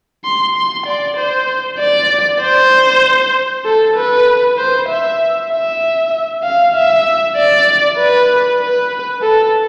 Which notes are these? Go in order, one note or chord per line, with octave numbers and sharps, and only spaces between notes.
C6
C6
D5
C5
D5
C5
A4
B4
C5
E5
E5
F5
E5
D5
B4
B4
A4